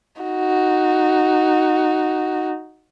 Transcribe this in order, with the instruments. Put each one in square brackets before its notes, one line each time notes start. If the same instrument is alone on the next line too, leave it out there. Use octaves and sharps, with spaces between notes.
[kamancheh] D#4 F#4